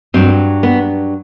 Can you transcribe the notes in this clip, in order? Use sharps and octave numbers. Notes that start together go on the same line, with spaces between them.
G2 F#3 C4
B3